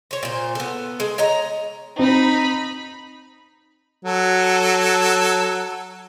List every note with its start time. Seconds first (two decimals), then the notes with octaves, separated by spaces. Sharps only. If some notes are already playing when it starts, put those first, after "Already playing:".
0.11 C5 C#5
0.23 A#2 C5
0.55 B3 A4
1.00 G#3
1.18 C#5 D#5 A#5
1.99 C4 D#4 B5
4.05 F#3 A4